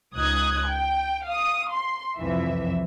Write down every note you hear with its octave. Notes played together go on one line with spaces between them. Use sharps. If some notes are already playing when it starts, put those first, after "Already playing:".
C#2 D#4 D#6 F#6 G#6
G5
F5 D#6
C6
C2 F2 E3 E5